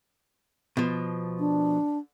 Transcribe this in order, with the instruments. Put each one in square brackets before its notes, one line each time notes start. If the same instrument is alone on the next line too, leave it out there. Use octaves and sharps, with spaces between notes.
[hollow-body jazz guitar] B2 F3
[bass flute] D4